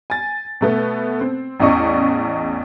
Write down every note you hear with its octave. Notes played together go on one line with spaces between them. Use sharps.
G#5 A6
B2 A3 B3
C4
A1 E2 C#4 D5 D#5 C#6